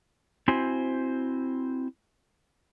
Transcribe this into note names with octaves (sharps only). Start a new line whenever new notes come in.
C4 E4 F#4 C5 G#5